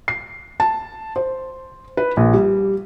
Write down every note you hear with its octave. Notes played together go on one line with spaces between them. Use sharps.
C7
A5
C5
B4
A#1
G3